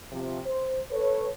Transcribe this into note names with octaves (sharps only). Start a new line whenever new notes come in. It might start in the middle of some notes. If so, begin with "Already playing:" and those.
C3 F3
C5
A4 B4 C#5